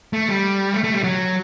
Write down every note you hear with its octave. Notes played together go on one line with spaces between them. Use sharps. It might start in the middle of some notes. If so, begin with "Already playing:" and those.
A3
G3
A3
A3
G3
F#3